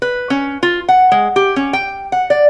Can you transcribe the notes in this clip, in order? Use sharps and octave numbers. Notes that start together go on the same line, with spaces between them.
B4
C#4
F4
F#5
G#3
G4
C#4
G5
F#5
D5